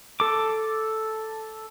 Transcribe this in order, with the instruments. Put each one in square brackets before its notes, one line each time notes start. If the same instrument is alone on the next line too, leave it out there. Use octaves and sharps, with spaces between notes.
[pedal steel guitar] A4 D6